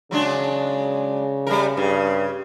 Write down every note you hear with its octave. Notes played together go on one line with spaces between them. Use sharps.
C#3 F#3 G#3 D4
G3 A3 A#4
G2 C#3